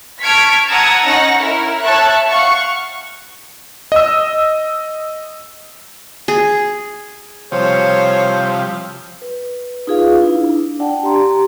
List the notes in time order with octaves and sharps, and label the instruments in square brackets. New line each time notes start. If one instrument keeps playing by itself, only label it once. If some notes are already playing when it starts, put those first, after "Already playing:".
[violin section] A5 C#6 F6 G#6 B6 D7
F#5 A5 A#5 D#6 E6 G#6
C#4 D#4 F#5 A#6
E4 A#4
C#5 E5 A5 C#6 F#6
F5 F#5 C#6
[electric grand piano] D#5 E6
[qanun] G#4
[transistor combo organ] C3 F3 G3 [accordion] C5 [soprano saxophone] C#5
[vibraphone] B4
D#4 F4 G#4 B4 F5
D4 E4
D4 D5 F#5 G5 A5
G4 A#5 C6